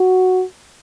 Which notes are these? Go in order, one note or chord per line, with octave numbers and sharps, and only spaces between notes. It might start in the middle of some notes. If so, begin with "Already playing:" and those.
Already playing: F#4